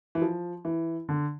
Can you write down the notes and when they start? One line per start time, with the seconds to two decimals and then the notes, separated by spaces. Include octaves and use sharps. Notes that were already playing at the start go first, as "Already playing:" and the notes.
0.15 E3
0.22 F3
0.65 E3
1.09 D3